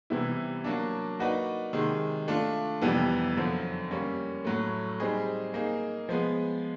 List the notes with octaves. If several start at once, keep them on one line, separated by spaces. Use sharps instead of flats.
C3 E3 G3 B3 E4
F#3 A#3 D4
A#3 D#4 F#4 B4 D5
C3 D#3 G#3
A3 D4 F4
F2 C3 E3 G3 B3
F#2 D3 F3
G3 A#3 C#4
A2 F#3 A3
G3 C4 D#4 G#4
A#3 D#4 G#4
F3 G#3 B3